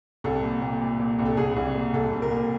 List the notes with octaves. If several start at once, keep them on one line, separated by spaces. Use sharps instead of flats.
C2 A4
A#2
A#2
A#2
A#2
C2
A4
C2 G#4
C2
A#2
C2 A4
C2
A#4
A#2